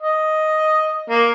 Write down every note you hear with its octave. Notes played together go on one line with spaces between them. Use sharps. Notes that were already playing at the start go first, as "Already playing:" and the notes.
D#5
A#3